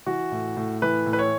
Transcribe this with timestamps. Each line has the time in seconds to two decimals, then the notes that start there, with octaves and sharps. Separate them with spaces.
0.06 E3 F#4
0.32 A2
0.57 A2
0.82 E3 B4
1.06 A2
1.13 B4
1.19 C#5